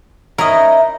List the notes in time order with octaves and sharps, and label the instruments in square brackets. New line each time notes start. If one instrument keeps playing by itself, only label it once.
[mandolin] C#4 D#4 E4 [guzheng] A#4 D#5